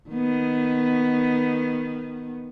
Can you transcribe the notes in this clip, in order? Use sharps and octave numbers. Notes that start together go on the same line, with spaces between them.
D#3 B3